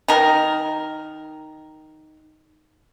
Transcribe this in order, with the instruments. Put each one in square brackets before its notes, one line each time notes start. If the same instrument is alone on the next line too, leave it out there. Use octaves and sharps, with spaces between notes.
[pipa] D#3 A#4